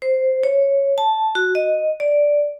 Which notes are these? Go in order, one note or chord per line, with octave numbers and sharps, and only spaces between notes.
C5
C#5
A5
F#4
D#5
D5